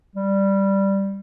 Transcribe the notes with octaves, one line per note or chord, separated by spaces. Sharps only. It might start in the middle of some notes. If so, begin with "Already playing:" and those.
G3